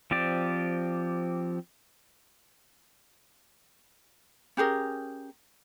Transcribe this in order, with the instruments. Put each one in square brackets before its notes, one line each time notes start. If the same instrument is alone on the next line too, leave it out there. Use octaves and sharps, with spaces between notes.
[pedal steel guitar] F3 C4 G4 D5
[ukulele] C#4 G4 G#4 A#4